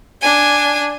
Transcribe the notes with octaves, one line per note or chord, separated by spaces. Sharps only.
D4 G#5